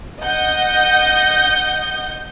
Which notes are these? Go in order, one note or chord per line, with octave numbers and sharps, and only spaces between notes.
D#5 F#5 G6